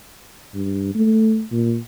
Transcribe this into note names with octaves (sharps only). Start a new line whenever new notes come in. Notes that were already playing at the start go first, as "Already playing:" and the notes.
G2
A3
A#2